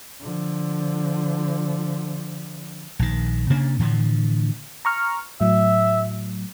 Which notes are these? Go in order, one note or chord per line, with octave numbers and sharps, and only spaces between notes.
D3 F3
A#1 D#3
C3 A#3 C#4 D4
A2 D3 E3 F3
A#5 C#6 F6
A2 F#3 E5